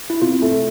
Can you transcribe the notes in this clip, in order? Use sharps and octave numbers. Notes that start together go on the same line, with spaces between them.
E4
C3 F4
A3